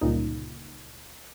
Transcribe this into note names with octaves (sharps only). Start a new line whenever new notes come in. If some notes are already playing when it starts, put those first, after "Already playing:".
G1 C#2 A#2 D#4